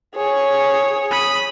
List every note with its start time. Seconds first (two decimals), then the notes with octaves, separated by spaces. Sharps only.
0.16 G#4 C#5
1.11 B5 D#6